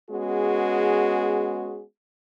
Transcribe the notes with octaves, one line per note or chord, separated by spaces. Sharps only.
G#3 B3 C#4 F#4 G#4